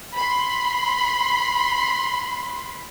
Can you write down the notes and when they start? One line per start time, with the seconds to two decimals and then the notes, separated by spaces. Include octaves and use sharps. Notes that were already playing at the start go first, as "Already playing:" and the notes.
0.14 B5 C6